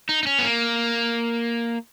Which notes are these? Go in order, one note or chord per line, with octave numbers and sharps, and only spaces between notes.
D#4
D#4
C#4
B3
A#3